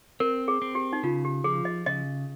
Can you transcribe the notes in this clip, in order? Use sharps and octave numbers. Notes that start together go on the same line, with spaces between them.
C4 A#4
G#4
C4
G4
D#4
C#3 F4
G4
F3 G#4
D#5
C#3 D#5